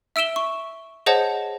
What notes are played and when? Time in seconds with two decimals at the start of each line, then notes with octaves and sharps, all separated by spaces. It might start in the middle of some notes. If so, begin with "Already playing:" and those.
0.16 E5 E6 D7 E7 G7
0.36 C#6
1.06 G#4 C5 C#5 D#5 F#5 A5